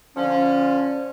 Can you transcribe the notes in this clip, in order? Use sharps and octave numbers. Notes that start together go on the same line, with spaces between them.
D3 F3 C#4